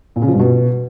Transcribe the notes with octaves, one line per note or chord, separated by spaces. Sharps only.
A#2
C#3
F3
G2
B2